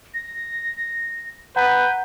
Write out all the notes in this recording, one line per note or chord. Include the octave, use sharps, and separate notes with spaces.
A#6
B4 F#5 A#5 G6